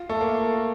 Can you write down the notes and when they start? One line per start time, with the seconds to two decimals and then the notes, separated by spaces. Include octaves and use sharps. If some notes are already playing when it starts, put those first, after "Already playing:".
Already playing: F4
0.09 A3
0.21 A#3